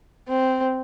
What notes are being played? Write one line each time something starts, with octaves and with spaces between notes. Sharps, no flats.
C4